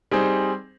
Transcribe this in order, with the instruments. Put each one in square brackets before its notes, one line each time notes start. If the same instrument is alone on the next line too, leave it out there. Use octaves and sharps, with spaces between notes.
[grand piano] G3 C4 D#4 G#4 C5